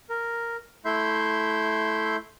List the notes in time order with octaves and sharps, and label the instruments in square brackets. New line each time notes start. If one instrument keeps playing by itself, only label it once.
[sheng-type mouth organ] A#4
A3 E4 E5 C6 G6